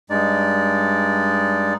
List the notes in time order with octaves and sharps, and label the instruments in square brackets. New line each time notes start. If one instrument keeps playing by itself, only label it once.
[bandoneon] G2 G#3 D#4 D5